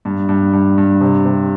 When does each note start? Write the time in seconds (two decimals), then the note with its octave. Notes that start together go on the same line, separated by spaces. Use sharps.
0.05 G2
0.29 G2
0.53 G2
0.78 G2
1.01 C3
1.26 C3